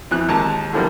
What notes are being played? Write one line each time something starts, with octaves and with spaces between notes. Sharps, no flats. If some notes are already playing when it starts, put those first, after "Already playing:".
F2 E3 F#6
D#2 G#3 A5 A#5
D3 E3 F3 G3 A#3